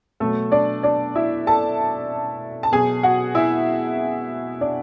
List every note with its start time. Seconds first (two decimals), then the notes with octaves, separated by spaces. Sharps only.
0.20 B2 F#3 A3 A4
0.52 D4 D5
0.83 D4 D5
1.15 E4 E5
1.47 A4 A5
2.63 A5
2.72 B2 F#3 G#4 G#5
3.03 F#4 F#5
3.35 E4 E5
4.61 D4 D5